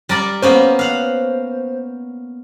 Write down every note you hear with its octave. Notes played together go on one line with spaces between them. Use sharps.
G3 A#4 D5
A#3 B3 C#4 C5
F5 F#5